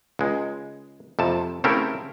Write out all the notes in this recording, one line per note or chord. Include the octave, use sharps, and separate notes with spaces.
C#2 G#3
F2 C3 A5
C#3 A3 C4 E4 G4 A#4